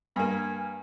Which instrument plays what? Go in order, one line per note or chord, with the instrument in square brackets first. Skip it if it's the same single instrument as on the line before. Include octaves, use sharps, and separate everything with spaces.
[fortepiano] G2 A#3 [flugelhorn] G#5